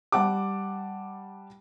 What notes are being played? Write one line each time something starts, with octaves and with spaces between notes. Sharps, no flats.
G3 F#5 A5 D6